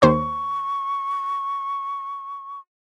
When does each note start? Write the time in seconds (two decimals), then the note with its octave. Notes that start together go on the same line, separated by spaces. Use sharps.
0.02 D#2 C5 C#5 C#6